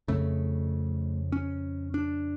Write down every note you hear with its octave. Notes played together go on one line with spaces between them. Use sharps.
F2 C#3 A3
C#4
D4